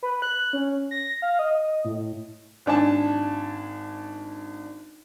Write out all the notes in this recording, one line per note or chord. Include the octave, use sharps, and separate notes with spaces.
B4
F#6
C#4
A#6
F5
D#5
A2
G#1 D4 G#5 A5